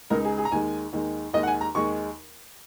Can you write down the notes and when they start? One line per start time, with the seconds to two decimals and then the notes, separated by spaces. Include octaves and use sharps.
0.10 C#2 C#3 G#3 D#4 A#4
0.25 G#4
0.38 G#4
0.45 A#5
0.51 D#2 D#3 G#3 G#5
0.93 D#2 D#3 G#3
1.34 D#2 D#3 G#3 D#5
1.43 F#5
1.47 G#5
1.61 A#5
1.75 D#2 D#3 G#3 C#6